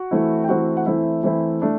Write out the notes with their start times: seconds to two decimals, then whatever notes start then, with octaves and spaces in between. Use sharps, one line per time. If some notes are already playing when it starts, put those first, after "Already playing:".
Already playing: F#4 F#5
0.11 E3 A3 C4 E4
0.44 G5
0.49 E3 A3 C4 E4 F#4 F#5
0.77 F#5
0.86 E3 A3 C4 E4 E5
1.23 E3 A3 C4 E4
1.62 A3 D4